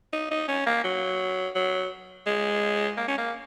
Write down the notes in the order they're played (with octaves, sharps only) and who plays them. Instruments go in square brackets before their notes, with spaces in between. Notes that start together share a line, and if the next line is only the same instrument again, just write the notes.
[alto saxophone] D#4
D#4
C#4
A#3
F#3
F#3
G#3
A#3
C#4
A#3